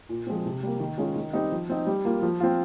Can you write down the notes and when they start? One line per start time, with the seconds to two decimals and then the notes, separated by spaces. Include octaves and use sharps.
0.09 A#2
0.27 F3 G#3 C4
0.46 C3
0.63 G3 A#3
0.80 D#3
0.98 G#3 C#4 F4
1.16 D#3
1.33 G3 C4 D#4
1.52 F3
1.69 C4 D#4
1.87 G3
2.05 A#3 F4
2.22 F3
2.40 C4 F4